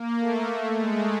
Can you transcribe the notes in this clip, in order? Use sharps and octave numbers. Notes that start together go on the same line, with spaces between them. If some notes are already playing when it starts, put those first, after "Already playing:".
Already playing: A#3
A3
A3
G#3